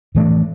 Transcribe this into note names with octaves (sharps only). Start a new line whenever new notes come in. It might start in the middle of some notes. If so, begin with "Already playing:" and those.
A2 E3 A3 D4